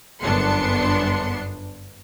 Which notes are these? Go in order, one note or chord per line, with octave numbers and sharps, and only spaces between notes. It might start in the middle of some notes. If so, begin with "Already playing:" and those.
G1 F#2 B3 D4 C6 C#7